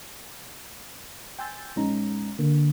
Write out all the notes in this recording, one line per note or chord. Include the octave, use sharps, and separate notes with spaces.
G5 G#5 C6 E6 G6 A6
A#1 G#3 C#4 D#4 A#5
D3 A#3